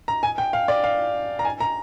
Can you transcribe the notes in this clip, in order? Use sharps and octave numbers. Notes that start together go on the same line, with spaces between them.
A#5
G#5
G5
F5
D5
F5
A#5
G#5
A#5